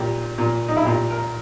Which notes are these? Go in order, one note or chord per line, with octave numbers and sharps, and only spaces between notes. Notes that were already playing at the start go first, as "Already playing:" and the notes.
Already playing: A#2 G4
A#2
D#4
E4
A#2 G4
A#4